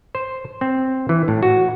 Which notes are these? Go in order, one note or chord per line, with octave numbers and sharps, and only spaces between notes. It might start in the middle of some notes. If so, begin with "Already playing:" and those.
C5
C4
E3
A2
F#4